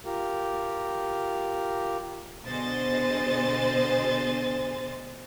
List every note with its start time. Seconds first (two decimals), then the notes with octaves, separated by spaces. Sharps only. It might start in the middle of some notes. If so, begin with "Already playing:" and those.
0.05 F4 G4 A#4
2.45 B2 D3 G#4 C5 D#5 A6